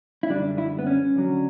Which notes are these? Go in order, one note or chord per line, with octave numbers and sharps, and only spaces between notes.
E4
F#2 D3 G3 D4
E4
B3
C#4
D2 D3 F#3